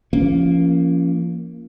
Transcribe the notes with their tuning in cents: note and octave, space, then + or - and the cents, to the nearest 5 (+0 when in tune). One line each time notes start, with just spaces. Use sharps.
F3 -30 A#3 +0 C#4 +0